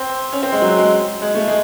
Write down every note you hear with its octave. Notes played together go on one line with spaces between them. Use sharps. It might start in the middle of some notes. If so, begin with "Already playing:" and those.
Already playing: C4
C#4
C4
G#3
F#3
G#3
G#3
A3
G#3